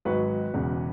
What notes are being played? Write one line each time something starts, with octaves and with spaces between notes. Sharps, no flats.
G#1 G#2 F#3 F#4 B4
E1 E2 C#3